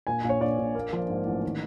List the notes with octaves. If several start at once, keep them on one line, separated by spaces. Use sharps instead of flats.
A#2 G#5
A#1
C#5
A#1 D5
A#1
A#3
F3
G#2
A1
D#3